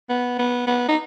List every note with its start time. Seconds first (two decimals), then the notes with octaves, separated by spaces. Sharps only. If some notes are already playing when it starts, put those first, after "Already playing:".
0.10 B3
0.39 B3
0.67 B3
0.89 D#4